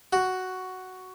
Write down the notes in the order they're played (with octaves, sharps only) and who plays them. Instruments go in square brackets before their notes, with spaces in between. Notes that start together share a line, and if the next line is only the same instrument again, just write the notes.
[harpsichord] F#4